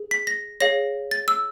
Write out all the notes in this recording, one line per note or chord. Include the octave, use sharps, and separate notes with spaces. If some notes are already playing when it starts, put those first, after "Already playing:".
Already playing: G#4
B6
A#6
G#4 C#5 F5 A#6
A6
E6